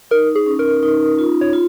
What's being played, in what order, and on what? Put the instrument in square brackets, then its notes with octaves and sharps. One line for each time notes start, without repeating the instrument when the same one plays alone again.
[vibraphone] D#4 [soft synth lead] A#4
[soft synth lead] G#4
[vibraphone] C#4
[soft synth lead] A#4
[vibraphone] D#4
F4
[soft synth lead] C#5
[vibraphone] F4